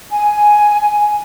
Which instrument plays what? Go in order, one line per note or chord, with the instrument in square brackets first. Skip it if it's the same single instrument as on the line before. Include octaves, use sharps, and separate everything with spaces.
[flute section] G#5